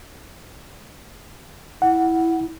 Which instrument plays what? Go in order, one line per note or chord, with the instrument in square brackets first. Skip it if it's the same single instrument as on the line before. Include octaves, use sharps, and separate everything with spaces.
[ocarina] E4 [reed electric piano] F#5